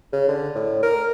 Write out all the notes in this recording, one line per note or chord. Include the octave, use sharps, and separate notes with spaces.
C#3
D3
A2
A#4